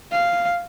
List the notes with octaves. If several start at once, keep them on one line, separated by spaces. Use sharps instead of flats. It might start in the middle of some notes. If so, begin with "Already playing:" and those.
F5